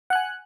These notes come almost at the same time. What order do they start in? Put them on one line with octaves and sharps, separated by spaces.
F#5 F#6 G#5